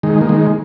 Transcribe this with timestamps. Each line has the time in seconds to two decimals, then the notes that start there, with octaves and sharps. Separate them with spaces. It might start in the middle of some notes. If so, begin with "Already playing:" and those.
0.03 D#3 G#3
0.21 A#3
0.29 D#3 G#3